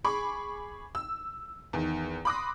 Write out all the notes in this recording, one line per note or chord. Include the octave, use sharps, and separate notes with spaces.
G#4 B5 C#6 D6
E6
E2 D#3
B5 C6 D6 D#6 F#6 A#6